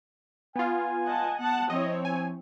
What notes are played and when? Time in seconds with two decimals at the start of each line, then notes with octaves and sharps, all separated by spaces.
0.56 B3 F4 G#5
1.07 D#5 F#5 A5
1.39 B3 F#5 A5
1.70 F3 C4 E4 C#5 D#5
2.05 G#5